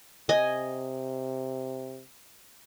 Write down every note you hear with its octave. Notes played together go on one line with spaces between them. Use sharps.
C3 D#5 G#5